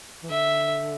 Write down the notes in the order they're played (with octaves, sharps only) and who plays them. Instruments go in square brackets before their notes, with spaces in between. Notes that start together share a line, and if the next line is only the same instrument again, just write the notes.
[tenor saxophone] E3
[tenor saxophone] D3 [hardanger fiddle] E5